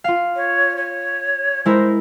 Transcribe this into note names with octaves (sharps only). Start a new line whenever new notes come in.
F4 F5
C#5
C#5
G#3 E4 A#4 C5